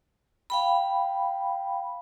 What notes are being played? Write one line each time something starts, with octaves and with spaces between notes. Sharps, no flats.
F5 G5 B5